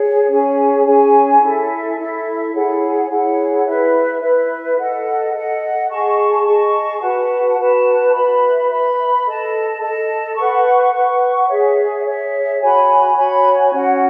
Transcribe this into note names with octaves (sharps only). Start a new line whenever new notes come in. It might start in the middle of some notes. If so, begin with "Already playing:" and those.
Already playing: G#4 C#5
C#4 G#4 C#5 G#5
C#4 G#4 C#5 G#5
E4 A4 E5
E4 A4 E5
E4 G#4 C#5 F#5
E4 G#4 C#5 F#5
E4 B4 E5
E4 B4 E5
A4 D#5 F#5
A4 D#5 F#5
G#4 D#5 A5 C#6
G#4 D#5 A5 C#6
F#4 B4 F#5 A5
F#4 B4 F#5 A5
B4 E5 B5
B4 E5 B5
A4 D#5 A5
A4 D#5 A5
B4 F#5 C#6
B4 F#5 C#6
G#4 C#5 E5
G#4 C#5 E5
F#4 C#5 G#5 B5
F#4 C#5 G#5 B5
C#4 F#4 C#5 F#5